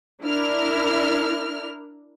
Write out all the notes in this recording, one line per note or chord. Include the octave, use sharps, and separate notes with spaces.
D4 E4 A#4 F6